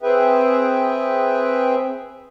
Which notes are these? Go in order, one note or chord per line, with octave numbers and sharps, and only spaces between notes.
C4 G#4 B4 E5 G5